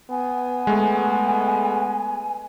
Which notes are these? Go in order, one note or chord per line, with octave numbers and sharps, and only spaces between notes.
B3 G#5
G#3 A3